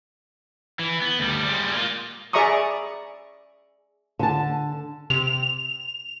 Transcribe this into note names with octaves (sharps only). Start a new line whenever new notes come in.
E3
B3
D2 G3
G3 G#3
A#3 F4
G#4 D5 E5 A#5 C#6 D#6
D3 A5
C3 F7